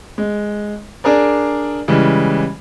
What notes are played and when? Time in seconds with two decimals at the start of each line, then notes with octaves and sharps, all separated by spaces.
0.18 G#3
1.04 D4 G#4 A#4 D5
1.88 C#3 E3 G3 G#3